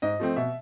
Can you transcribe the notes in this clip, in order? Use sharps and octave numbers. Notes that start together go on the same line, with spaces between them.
G#2 D#5
F3 A3 C4
B2 E5